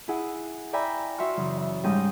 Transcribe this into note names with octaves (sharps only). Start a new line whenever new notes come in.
E4 G#4 F#5
D5 E5 G5 G#5 A#5 B5
F#4 E5 C6 C#6 F6
F#2 C#3 E3
E5
G#2 G3 C#4 G#4 G5 D#6